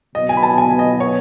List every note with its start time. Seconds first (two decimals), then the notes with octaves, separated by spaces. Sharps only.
0.15 B2 F#3 B3 D#5
0.29 G#5
0.37 B5
0.43 A5
0.58 G#5
0.79 D#5
1.00 C#5